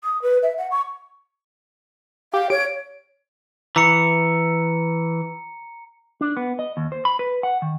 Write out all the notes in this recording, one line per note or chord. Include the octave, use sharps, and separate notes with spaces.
D#6
B4
E5
F#5
C#6
G4 F5
C#5 D7
E3 A#5 C#7
D4
B3
D#5
D#2
C5
B5
B4
F#5
D#3